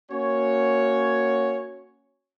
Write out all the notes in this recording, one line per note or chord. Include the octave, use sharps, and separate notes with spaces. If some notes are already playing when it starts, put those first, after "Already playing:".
A#3 C#4 F#4 C#5